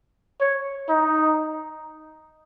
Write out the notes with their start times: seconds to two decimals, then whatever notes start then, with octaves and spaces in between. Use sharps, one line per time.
0.41 C#5
0.89 D#4